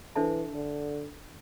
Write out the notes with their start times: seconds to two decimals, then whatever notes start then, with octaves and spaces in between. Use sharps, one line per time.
0.16 E3 D4 A4 C5 E5 A5
0.54 D3